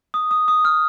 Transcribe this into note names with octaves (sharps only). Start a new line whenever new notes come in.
D#6
D#6
D#6
F6